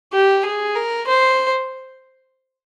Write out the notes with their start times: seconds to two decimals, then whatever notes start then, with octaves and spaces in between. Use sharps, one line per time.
0.13 G4
0.45 G#4
0.75 A#4
1.07 C5